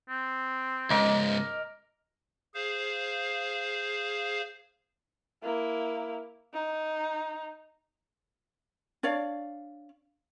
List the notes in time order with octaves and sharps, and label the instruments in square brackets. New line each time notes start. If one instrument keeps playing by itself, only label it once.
[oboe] C4
[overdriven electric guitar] C#2 G#2 [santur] A#4 [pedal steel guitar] D#5 D6
[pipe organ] G#4 C5 F5
[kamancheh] A#3 E4
D#4
[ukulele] D4 C#5 D5 F5